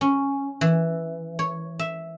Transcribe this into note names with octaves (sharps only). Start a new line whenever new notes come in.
C#4
E3
C#5
E5